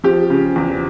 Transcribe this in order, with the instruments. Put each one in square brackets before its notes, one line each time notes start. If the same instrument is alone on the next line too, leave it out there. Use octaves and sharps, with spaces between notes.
[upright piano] F3 G4
C#3
E2